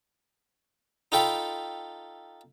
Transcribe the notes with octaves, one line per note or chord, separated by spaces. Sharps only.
D#4 F4 A4 G5 B5